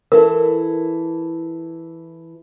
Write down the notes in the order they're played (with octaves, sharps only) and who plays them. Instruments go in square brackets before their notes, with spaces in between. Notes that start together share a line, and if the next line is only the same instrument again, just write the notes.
[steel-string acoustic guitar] E3 E4 A4 [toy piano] A#4